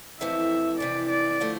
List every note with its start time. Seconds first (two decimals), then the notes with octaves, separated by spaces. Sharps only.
0.21 F2 C3 E3 A3 E5
0.80 F2 C3 E3 D5
1.10 D5
1.40 D3 F3 A3